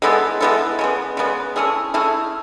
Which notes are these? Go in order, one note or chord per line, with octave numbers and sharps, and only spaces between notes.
G#3 B3 E4 A4
G#3 B3 E4 A4
C#3 G#3 B3
C#3 G#3 B3
A3 C#4 E4 G#4
A3 C#4 E4 G#4